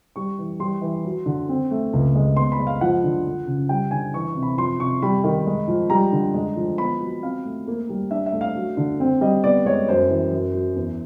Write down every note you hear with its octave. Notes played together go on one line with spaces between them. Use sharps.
G3 C#6
E3
G3 C6
E3
F#3
D3
C4
A3
C#2
G#3
B3 C6
B5
G#3
F5
F3 F#5
D3
F3
C#3
G3 G5
D3 G#5
E3 C#6
C#6
C3
B5
F3 C6
C3 C#6
G3 B5
D#3
G#3
F3
G3 A#5
D3
G#3
F3
B3 B5
F#3
C4 F5
A3
A#3
G3
D4 E5
E5
A3
F5
F#3
D3
C4
G3 D#5
B3 D5
G#3 C#5
F#2 C5
E3
F#2
F#3
E2